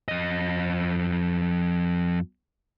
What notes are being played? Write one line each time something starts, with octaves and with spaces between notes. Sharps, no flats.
F2 D#5